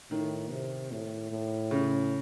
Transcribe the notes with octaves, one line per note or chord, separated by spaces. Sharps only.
A2 D#3
C3
A2
A2
C#3